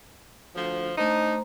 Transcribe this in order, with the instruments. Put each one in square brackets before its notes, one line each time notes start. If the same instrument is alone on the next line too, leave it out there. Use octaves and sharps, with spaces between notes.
[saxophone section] D2 F3
[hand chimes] A3 C5 A#5 [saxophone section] D4 D#4